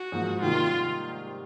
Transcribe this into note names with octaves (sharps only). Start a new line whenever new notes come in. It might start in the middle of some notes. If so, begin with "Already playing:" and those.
Already playing: F#4
G#2 F3 A#3
C3 D#3 G3 A#3 F4